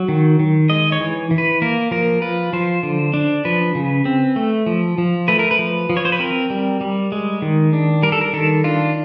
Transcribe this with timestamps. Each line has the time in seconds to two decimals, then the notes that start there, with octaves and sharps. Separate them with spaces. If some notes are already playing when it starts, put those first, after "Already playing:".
Already playing: F#3
0.09 D#3
0.39 D#3
0.70 G#3 D#5
0.92 C#5
1.00 E3
1.31 E3
1.38 B4
1.62 A#3 A#4
1.91 F3 A#4
2.22 F4 B4
2.53 F3 C5
2.83 D3
3.14 D4
3.45 F3 B4
3.75 C#3
4.05 C4
4.36 A3
4.66 F3
4.98 F3
5.28 A3 B4
5.39 A#4
5.51 B4
5.59 F3
5.90 F3
5.97 C#5
6.05 C5
6.12 B4
6.19 C4 A#4
6.50 G3
6.81 G3
7.12 G#3
7.42 D#3
7.73 D4
8.03 G3 A#4
8.12 A4
8.21 A#4
8.33 D#3 A4
8.64 D4 F4